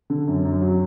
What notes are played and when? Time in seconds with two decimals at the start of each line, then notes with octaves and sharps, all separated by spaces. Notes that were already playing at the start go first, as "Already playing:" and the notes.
0.10 D3
0.27 F#2
0.45 F#2
0.62 F#3